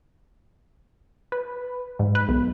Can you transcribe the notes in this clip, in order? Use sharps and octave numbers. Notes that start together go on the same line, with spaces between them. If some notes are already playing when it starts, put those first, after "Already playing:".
B4
G#2
B4
B1